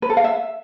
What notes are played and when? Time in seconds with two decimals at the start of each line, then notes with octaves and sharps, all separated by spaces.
0.02 B4
0.10 A4
0.17 F5
0.24 E5